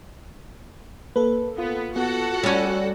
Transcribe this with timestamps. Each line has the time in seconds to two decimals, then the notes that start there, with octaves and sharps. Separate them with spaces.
1.16 A#3 A4 B4
1.58 B3 F4
1.96 B3 F#4 A4 F#5
2.43 G3 C#4 C#5 D5 E6